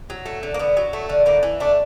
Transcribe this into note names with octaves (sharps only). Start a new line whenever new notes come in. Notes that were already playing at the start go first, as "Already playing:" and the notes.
F#3
A3
D3
A#3
D3 B3
F#3
A3
D3
A2 A#3
E3
A3 D4